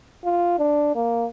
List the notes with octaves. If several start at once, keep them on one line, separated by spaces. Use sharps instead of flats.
F4
D4
A#3